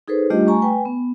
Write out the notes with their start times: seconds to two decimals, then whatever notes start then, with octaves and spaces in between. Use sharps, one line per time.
0.08 D#4 G#4 A4 B4 C5
0.30 G3 A3 D4 F4 G4 D#5
0.47 A3 G#5 A#5 C#6
0.62 B4 G5 G#5
0.85 B3